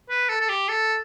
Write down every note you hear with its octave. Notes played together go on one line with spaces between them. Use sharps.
B4
A4
A4
G4
A4